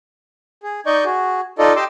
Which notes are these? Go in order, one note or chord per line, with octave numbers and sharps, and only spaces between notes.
G#4
D#4 D5 D#5 C#6 G6
F#4 G#4
D#4 F4 A4 D5 D#5
G4 D#5 G5 C6 D6 E6